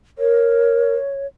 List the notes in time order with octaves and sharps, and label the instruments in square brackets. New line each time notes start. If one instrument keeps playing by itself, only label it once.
[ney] A#4 [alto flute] C#5